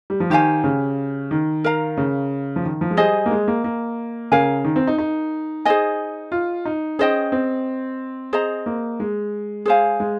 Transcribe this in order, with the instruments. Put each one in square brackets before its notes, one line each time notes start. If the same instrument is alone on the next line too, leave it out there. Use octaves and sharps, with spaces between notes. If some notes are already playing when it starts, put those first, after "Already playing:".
[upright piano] G3
F3
[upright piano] D#3 [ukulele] G4 C5 F5 G#5
[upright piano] C#3
D#3
[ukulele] A#4 F5 A#5
[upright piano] C#3
F3
D#3
F3
G#3
[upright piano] G3 [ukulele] G#4 C5 D#5 G#5
[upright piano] A#3
G#3
A#3
A#3
[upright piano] C#3 [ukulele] A#4 F5 G#5
[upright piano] D#3
C4
D#4
D#4
[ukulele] G#4 C5 D#5 G#5
[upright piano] F4
D#4
[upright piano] C#4 [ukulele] G#4 C5 D#5 G5
[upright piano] C4
[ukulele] G#4 C5 D#5 A#5
[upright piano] A#3
G#3
[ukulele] G#4 C5 F5 G#5
[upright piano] G#3